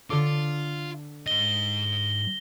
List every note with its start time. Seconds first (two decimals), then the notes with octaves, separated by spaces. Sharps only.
0.10 D3 F4 A4 D6
1.26 G#2 D#5 A#6 G7